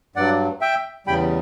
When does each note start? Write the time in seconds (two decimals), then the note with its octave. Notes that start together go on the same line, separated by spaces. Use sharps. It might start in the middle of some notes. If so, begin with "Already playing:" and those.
0.16 G2 F#3 D5 F#5
0.61 E5 G5
1.06 E2 C#3 G3 G5 B5